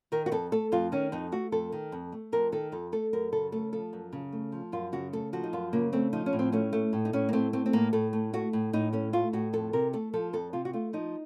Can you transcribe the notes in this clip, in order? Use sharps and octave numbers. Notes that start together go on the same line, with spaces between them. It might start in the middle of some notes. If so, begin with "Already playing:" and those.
D#3 A#4
F#4
F2 A4
A3 A4
F2 F4
D#3 C#4
F2 D#4
A3 F#4
F2 A4
D#3
F2
A3
F2 A#4
D#3 A4
F2 A4
A3 A4
F#2 A#4
C#3 A4
A3 A4
F3 A4
F#2
C#3
A3
F3
F#2 F4
C#3 F#4
A3 A4
F3 F#4
D#4
F#2 F4
C#3 A#3
A3 C4
F3 D#4
C#4
A2
C4
A3 C#4
A3
A2
D#4
A2 C#4
A#3
A3 C4
A3 C4
C4
A2 A#3
A2 A4
A3
A3 F#4
A2
A2 D#4
A3 C#4
A3 F4
A2 F#4
F2 A4
C3 A#4
A3 A4
F3 A4
F2 A4
C3 F4
F#4
A3 F4
F3 D#4